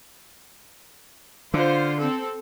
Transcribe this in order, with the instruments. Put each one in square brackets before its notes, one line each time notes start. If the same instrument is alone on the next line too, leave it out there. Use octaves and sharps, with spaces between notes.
[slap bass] D3 [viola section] F4 C5
[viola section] C4 A4